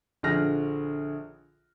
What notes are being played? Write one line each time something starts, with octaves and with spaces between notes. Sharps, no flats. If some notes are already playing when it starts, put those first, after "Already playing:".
A#1 D3 G#4 F6 A#6